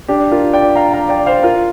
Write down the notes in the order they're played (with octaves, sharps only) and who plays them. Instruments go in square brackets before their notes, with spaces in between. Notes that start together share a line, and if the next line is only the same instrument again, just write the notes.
[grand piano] D4 G4
F4 A#4
D5 G5
F5 A#5
F5 A#5
D5 G5
C5 F5
F4 A#4